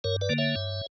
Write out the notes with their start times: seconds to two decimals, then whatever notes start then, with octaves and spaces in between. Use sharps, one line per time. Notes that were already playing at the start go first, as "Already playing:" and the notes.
0.04 G2 A#4 C#5
0.21 B4 D5
0.29 D3 A#3
0.38 C#5 E5
0.56 G2